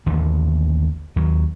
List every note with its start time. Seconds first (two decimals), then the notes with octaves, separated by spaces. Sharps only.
0.06 A1 D#2 D3
1.16 D#2 F#3